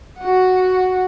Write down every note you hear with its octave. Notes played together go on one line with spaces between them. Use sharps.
F#4 F#5